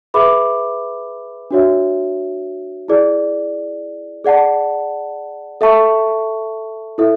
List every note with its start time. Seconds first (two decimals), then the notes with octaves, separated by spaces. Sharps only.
0.14 G#4 B4 E5 B5 D6
1.51 D4 F#4 C#5 E5
2.88 E4 G#4 D5
4.24 G#4 D5 F#5 A5
5.61 A4 E5 A5 C#6
6.98 E4 A4 E5